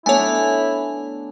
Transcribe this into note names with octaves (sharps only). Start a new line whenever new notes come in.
A3 B3 D4 E4 C#5 G#5